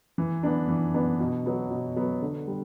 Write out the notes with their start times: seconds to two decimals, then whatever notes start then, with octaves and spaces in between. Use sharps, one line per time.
0.18 E3
0.43 B3 D4
0.68 E3
0.94 B3 D4
1.20 B2
1.46 F#3 B3
1.71 B2
1.96 F#3 B3
2.22 D3
2.47 G3